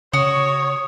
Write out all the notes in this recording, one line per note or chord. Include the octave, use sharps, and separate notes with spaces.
C#3 F#4 C#5 D#6